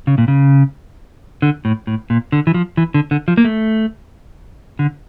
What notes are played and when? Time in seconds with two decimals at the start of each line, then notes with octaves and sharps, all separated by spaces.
0.07 C#3
0.18 A#2
0.28 C#3
1.42 D3
1.65 A2
1.87 A2
2.10 A#2
2.32 D3
2.47 E3
2.54 F3
2.77 E3
2.94 D3
3.11 D3
3.28 F3
3.37 A#3
3.45 A3
4.79 D3